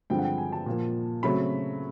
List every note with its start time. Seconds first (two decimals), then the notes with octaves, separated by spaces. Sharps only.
0.10 G2 D3 F3 G#3 C4 G5
0.19 F#5
0.24 G5
0.38 G#5
0.53 A5
0.66 A#2 F3 A#3
1.23 C#3 F#3 A3 C4 B5